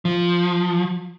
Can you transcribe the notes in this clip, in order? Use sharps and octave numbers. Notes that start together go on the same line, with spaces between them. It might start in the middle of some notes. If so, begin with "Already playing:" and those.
F3